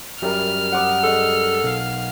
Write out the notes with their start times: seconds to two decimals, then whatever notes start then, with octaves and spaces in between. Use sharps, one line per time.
0.22 F#2 G3 A#4 B4 E5 F6
0.72 F#5 D6 D#6
1.03 G#3 A4 D#5
1.63 B1 F5